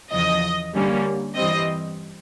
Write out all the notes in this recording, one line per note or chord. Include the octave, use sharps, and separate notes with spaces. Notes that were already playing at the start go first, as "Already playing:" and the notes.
E2 C#3 F3 D#5
D3 G3 A#3 C#4
G2 E3 G3 C4 D#5